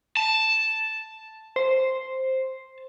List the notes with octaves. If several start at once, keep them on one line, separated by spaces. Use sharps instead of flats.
A5
C5